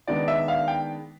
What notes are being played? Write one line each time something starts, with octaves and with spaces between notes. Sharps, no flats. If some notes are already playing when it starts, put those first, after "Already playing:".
D#3 G#3 B3 D4 D5
E5
F5
G5